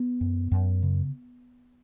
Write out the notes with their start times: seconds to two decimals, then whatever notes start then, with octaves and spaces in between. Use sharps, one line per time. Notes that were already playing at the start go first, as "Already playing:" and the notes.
Already playing: B3
0.21 F#2
0.52 F#2
0.83 C#3